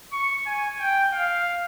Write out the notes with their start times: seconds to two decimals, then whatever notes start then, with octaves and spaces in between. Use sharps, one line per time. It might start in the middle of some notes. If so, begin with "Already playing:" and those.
0.13 C#6
0.46 G#5
0.80 G5
1.13 F5